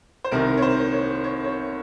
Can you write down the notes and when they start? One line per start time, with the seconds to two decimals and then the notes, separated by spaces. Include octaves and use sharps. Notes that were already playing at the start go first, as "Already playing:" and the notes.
0.24 C5
0.31 C2 C3 D#3 A#4
0.57 C#5
0.62 C5
0.93 C#5
1.24 C#5
1.45 C#5